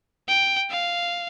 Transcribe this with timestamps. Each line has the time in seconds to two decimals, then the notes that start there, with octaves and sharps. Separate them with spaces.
0.28 G5
0.70 F5